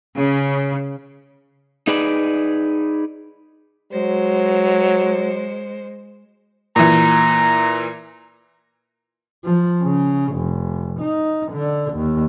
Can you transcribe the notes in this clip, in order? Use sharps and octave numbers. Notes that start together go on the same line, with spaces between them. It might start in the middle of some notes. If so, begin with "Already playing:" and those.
C#3
D#4 G#4 B4 D5
F#3 G#3 C5
A#2 E3 A#5
F3
C#3
F1
D#4
D3
D#2